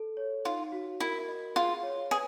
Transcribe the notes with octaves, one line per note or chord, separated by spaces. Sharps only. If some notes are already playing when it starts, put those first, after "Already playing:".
Already playing: A4
C#5
D#4 F4
F#4
E4 A#4
D#5
F4 G#4
C#5
G#4 B4